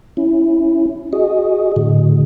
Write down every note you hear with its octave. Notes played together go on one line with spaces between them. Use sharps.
C#4 E4
F#4 G#4 D#5
A2 D3